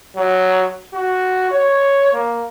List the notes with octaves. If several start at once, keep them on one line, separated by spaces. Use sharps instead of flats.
F#3
F#4
C#5
A#3